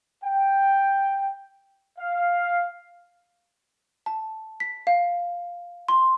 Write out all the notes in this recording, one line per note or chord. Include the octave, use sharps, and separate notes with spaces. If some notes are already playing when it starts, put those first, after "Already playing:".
G5
F5
A5
B6
F5
C6